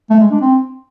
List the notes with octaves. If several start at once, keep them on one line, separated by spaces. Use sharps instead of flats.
A3
G#3
D4
C4